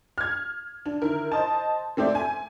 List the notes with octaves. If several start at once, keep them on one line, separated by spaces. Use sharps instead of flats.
F6 G#6
D4
D3 D#3 E4 A#4
C5 D#5 A5
A3 C4 C5 D5 E5
G#5